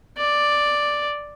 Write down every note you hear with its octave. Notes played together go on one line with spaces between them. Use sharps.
D5